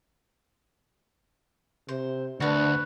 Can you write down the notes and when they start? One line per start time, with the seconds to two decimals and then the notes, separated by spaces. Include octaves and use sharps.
1.89 C3 C5
2.40 D2 D4 F#4 B4